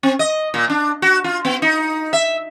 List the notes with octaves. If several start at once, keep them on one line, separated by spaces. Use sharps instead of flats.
C4
D#5
A#2
D4
F#4
F4
B3
D#4
E5